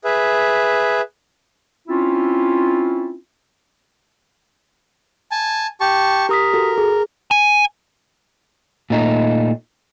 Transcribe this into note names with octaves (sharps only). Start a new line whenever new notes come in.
G#4 B4 E5
C4 C#4 E4 F4
G#5 A5
G4 A5 C#6
G4 A#4 D#6 B6
F#4 A4
G#4
G#5
A#2 A3 D#4